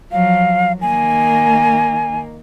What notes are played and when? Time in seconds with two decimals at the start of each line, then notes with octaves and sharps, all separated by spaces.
0.12 F3 F#3 F5
0.82 D#3 A#3 G#5